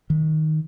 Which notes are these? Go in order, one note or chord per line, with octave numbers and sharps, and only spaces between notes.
D#3